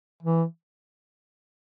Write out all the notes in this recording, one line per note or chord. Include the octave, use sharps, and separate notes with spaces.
E3